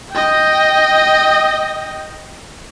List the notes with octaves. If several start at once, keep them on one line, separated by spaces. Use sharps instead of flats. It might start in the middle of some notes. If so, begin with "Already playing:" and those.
D#5 G5